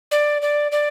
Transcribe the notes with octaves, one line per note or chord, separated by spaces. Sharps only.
D5
D5
D5